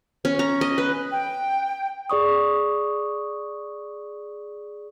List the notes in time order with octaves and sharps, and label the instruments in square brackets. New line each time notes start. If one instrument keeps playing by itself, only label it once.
[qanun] C#4
A#5
D#5
B4
[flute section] G5
[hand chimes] G#4 D5 C#6 D#6